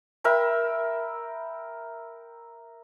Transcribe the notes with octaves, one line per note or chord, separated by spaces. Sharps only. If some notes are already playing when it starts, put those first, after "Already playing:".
A#4 E5 G5 B5